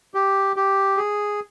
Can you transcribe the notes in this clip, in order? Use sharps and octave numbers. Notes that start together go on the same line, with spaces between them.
G4
G4
G#4